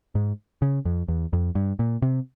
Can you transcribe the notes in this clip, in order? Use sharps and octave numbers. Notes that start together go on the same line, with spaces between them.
G#2
C#3
F2
E2
F2
G2
A#2
C3